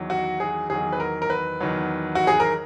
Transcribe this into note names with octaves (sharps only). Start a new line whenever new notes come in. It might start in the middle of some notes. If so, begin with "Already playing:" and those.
Already playing: E2 D#3 F#3
F#4
G#4
E2 D#3 F#3 G#4
B4
A#4
A#4
B4
E2 D#3 F#3
F#4
G#4
A#4